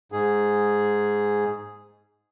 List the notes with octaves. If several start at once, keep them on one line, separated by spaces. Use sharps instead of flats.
G#2 G#4